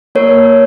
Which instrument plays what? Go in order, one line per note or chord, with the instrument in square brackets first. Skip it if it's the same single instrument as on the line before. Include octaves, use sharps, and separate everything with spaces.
[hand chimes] A#3 A#4 C#5